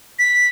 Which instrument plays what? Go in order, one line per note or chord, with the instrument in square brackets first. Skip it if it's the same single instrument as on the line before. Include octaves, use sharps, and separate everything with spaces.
[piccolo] B6